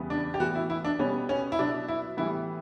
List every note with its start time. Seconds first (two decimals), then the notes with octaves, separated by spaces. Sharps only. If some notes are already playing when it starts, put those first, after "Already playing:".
Already playing: E2 C#3 G3 B3
0.10 D4
0.34 G4
0.40 A2 E3 B3 F#4
0.55 E4
0.70 E4
0.85 D4
0.99 B2 G3 B3 C#4
1.29 C#4
1.52 E4
1.59 B2 F#3 B3 D4
1.88 E4
2.17 A2 E3 G3 B3 E4